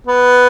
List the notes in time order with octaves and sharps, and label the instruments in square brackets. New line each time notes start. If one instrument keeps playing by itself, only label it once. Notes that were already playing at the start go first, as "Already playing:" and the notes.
[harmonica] B3